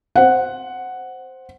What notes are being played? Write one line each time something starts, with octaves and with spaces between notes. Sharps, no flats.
C5 F#5